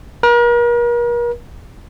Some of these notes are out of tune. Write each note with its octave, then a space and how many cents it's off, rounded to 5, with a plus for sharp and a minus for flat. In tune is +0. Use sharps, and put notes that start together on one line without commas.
A#4 +40